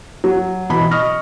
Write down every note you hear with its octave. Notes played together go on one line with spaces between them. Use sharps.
F#3
B2 E3 D#5 B5
D#5 C#6 D#6 F6 A#6